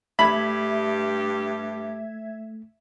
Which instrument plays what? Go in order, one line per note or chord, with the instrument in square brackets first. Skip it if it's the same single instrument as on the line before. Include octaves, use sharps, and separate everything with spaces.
[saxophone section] G2 G4 [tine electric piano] A3 [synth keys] E5 G#6 [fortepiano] B5